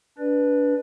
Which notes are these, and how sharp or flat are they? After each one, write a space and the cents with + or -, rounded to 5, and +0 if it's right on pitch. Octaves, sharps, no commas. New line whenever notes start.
D4 -25 B4 -10 D5 +25